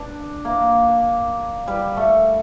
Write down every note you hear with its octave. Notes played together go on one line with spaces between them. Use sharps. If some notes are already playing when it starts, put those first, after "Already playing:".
Already playing: D4
A#3
G3
A3